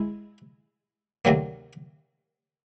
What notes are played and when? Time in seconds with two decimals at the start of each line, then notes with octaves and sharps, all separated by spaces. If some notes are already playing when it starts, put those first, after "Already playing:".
Already playing: G#3 E4
1.25 D2 C3 D#3 F#3 A#3